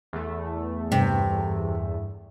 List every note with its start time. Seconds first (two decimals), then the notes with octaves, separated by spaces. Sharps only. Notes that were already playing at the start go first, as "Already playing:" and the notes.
0.13 E2 A3
0.92 G2 C3